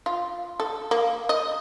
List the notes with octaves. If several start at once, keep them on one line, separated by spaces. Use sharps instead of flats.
F4
A4
A#3
D#5